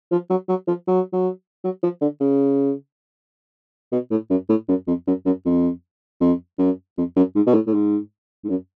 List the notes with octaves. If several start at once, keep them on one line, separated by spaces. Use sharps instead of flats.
F3
F#3
F#3
F3
F#3
F#3
F#3
F3
D3
C#3
B2
A2
F#2
A2
F#2
F2
F#2
F#2
F2
F2
F#2
F2
F#2
G#2
B2
A2
A2
G#2
G#2
F#2